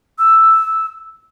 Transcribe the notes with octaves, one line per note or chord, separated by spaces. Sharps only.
E6